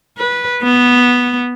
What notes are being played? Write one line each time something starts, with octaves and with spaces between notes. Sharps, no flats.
B4
B3